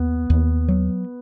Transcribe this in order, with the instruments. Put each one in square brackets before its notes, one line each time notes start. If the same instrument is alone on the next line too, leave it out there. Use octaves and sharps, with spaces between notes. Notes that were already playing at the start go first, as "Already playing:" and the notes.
Already playing: [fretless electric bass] D#2 [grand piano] B3
[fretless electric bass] D#2
F#3